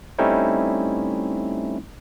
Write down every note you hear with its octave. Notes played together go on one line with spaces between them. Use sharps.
G3 A3 C4 C#4 D#4 E4